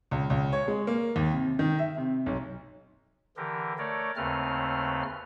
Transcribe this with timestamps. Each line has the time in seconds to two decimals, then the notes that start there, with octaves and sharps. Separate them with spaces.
0.11 C#2
0.30 C#2
0.53 C#5
0.68 G#3
0.87 A#3
1.16 D#2
1.32 C3
1.59 D#3
1.79 E5
1.97 C3
2.26 B1
3.37 D3 E3 G4 A#4
3.78 A3 A#4 C#5 D5
4.17 D#2 C#3 A3 C4 B4 F6